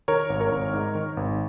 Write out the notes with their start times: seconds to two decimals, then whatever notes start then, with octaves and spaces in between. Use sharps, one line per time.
0.08 D#3 A#4 C#5
0.30 G#1
0.40 A#4 C#5
0.52 G#1
0.74 G#2
0.95 D#3
1.17 G#1